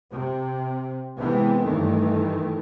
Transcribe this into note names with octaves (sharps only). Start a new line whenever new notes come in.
C3
C3 E3 G#3 B3 C4
G2 D#3 E3 A3